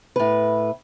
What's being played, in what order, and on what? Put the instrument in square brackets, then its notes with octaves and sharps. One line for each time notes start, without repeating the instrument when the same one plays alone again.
[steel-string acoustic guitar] A2 B4